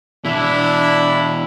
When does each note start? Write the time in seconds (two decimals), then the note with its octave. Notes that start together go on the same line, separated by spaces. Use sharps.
0.25 B2 E3 D4 E4